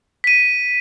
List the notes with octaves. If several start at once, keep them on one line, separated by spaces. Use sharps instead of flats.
B6 D#7